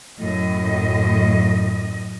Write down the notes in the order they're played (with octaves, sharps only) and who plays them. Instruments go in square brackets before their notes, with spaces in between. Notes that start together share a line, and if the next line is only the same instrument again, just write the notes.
[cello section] F#2 A2 D#5